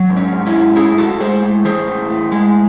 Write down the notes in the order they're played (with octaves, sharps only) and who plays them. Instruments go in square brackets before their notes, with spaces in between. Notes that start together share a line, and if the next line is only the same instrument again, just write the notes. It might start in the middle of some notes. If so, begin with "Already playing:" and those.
Already playing: [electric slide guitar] F#3
G#2
C#4
G#2
C#4 E4
G#2
A2 E4 G#4
A2 F#4 A4
G#3 G#4 C5
A2
E3 G#4 C5
A2
A2
G#3